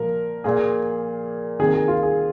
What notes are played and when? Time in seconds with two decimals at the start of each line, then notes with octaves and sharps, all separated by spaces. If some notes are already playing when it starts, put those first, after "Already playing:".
Already playing: A#2 F3 A#3 A#4
0.44 A#2 A#3 G#4
1.59 C3 D#3 A#3 G#4
1.74 G#4
1.88 F4
2.03 G#4